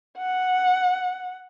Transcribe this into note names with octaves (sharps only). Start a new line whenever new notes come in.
F#5